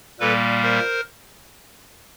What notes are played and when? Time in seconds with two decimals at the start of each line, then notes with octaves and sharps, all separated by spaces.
0.20 A#2 G3 A#3 A4 B4
0.63 A#4 C5